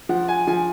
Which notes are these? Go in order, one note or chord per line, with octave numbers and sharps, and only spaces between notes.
F3 F#5
G#5
F3 G#5